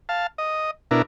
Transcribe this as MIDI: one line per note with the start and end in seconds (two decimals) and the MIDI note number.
0.09 0.27 77
0.09 0.27 81
0.38 0.71 75
0.91 1.02 47
0.91 1.02 62
0.91 1.02 64
0.91 1.02 70